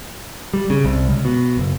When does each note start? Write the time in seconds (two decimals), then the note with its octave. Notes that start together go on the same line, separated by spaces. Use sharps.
0.53 G3
0.70 C#3
0.85 C2
1.09 C#2
1.25 B2
1.57 F#1